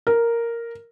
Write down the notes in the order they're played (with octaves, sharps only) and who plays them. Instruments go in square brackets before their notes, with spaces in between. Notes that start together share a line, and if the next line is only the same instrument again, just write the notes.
[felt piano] A#4